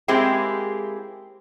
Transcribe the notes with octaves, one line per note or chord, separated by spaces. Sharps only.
G#3 A#3 C4 E4 G4 G#4